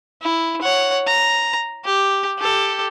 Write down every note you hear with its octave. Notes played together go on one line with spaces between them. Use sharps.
E4
C#5 F#5
A#5
G4
G4 A4